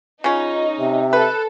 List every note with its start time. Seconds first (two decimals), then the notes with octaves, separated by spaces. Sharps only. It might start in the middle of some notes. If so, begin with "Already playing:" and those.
0.24 C#3 C#4 D#4 F4
0.79 C3 E5
1.13 A4 B4